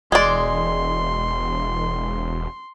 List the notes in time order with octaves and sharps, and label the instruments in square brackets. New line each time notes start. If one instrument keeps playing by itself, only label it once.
[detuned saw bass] E1 [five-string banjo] G#3 D5 [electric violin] C6